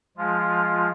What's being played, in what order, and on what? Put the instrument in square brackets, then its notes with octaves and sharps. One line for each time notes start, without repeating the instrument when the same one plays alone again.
[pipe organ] F3 G#3 F4